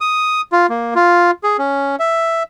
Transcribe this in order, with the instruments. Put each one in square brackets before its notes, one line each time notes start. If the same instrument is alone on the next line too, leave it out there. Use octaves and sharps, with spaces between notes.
[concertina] D#6
F4
A#3
F4
G#4
C#4
E5